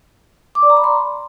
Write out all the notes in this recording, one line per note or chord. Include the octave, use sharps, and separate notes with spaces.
D6
D5
A#5
B5
C6